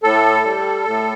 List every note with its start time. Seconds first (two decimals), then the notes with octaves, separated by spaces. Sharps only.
0.03 A2 A4
0.44 G3
0.85 A2